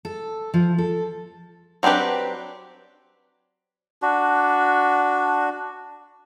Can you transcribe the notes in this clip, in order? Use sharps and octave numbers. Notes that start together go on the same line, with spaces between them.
A4
F3
A4
F#3 C4 D4 G4 B4
D4 F#4